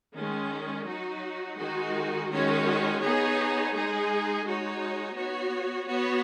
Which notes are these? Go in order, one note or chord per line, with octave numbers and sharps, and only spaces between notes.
D#3 G#3 C#4
F#3 D#4 F#4
D#3 G#3 D#4 F#4
D#3 G#3 C#4 F#4 C#5
B3 D#4 G#4 C#5
G#3 D#4 G#4
G#3 D#4 F#4 C#5
B3 F#4 C#5
B3 F#4 C#5